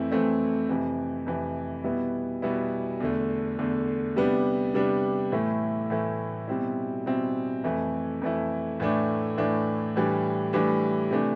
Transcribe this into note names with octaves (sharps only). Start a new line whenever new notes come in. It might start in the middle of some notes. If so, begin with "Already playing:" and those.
Already playing: F2 E3 A3 C4 E4
F2 E3 A3 C4 E4
F2 C3 E3
F2 C3 E3
B2 G3 B3 E4
B2 G3 B3 E4
E2 D3 A3
E2 D3 A3
C3 G3 B3 D4
C3 G3 B3 D4
A2 E3 A3 E4
A2 E3 A3 E4
B2 G3 C4 E4
B2 G3 C4 E4
F2 E3 A3 E4
F2 E3 A3 E4
A2 E3 A3 D4
A2 E3 A3 D4
A2 E3 G3 D4
A2 E3 G3 D4
C3 E3 A3 D4